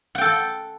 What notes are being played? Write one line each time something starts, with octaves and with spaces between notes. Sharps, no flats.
A4 F#5 G5